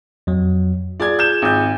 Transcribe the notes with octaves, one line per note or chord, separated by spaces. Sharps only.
F2 F#3
F4 G#4 D5 G#6
G6 E7
G#1 G6